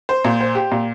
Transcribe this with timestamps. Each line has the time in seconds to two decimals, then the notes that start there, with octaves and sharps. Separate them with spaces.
0.09 C5
0.24 A#2
0.40 C5
0.55 G4
0.71 A#2